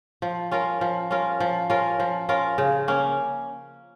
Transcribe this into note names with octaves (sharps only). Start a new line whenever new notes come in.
F3
C#4 F4 A#4
F3
C#4 F4 A#4
F3
C#4 F4 A#4
F3
C#4 F4 A#4
C#3
A#3 C#4